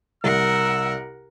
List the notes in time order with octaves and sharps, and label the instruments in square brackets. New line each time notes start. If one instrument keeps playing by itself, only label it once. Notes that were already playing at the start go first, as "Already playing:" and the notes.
[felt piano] C2 [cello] A#4 F#5 [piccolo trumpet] E6